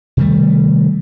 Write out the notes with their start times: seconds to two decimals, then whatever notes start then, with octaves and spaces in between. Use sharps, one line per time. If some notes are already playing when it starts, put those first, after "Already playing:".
0.17 C3 D#3 G3 A3